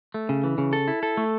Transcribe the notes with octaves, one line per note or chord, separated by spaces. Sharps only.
A3
C#3
E3
C#3
A4
E4
A4
A3